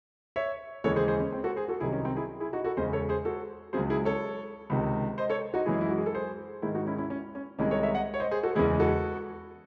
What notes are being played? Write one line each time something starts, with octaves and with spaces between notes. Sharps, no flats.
C#5 E5
D#2 C#3 E3 G#3 A4 C#5
G#4 C5
G#4 C5
C#4
C4
F#4 A4
G#4 C5
F#4 A4
C2 C3 D#3 F#3 E4 G#4
C#4
C4 D#4
E4 G#4
E4 G#4
D#4 F#4
F#4 A4
E2 C#3 G#3 C5 D#5
A4 C#5
G#4 C5
F#4 A4
C#2 C#3 F#3 G#4 C5
E4 G#4
A4 C#5
C#2 C3 D#3
C5 D#5
A4 C#5
D#4 F#4
F#2 E3 G#3 E4 G#4
E4
F#4
G#4
A4
G#4 C5
G#2 D#3 G#3 E4 G#4
D#4 F#4
C#4 E4
C#4 E4
C#4
C#4
C2 C3 D#3 G#3 C#4 E4
A4 C#5
C#5 E5
D#5 F#5
C#5
C5 D#5
G#4 C5
F#4 A4
E2 C#3 E3 G#3 E4 G#4
F#4 A4